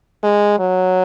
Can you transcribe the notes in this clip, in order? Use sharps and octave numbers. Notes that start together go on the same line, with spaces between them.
G#3
F#3